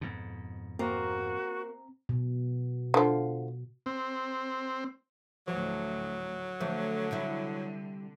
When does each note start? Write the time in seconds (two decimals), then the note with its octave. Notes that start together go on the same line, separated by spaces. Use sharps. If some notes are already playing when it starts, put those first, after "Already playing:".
0.01 F2 G#2 B2
0.79 A#3 C4 F#4 A#5
2.09 B2
2.94 D3 F3
3.86 C4
5.48 D2 A2 F3 F#3
6.61 D3 F3 A3
7.11 C3 G3 E4